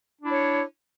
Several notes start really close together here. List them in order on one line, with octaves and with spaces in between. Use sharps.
D4 E4 C#5